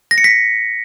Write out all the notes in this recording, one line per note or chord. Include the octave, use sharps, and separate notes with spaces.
A#6
C#7
B6